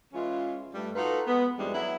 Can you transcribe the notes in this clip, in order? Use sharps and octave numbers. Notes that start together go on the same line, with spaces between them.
E3 G#3 C#4 F4
G2 G3 A3
D#4 F4 F#4 A4 B4
G#3 B3
F2 E3 G3 G#3 D4
F#3 B3 E4